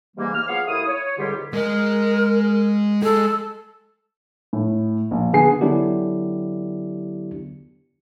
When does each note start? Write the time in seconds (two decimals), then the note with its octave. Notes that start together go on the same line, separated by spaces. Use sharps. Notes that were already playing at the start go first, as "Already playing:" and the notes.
0.17 G#2 C3 E3 G3 A#3
0.34 F6
0.48 F3 B3 G#4 C#5 F5
0.67 D#2 A3 E4 F5 D#6
0.87 C#5
1.17 C#2 G#2 D3 G3 F4 G4
1.53 G#3 A#4 D#5
3.02 G#3 G#4 A4
4.53 A2
5.11 A#1
5.33 D3 B3 G#4 G#5 C7
5.61 D3 F#3 B3 D4 E4 G4